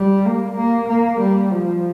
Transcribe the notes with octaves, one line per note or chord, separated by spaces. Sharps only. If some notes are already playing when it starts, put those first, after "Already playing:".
Already playing: G3
A#3
A#3
A#3
G3
F3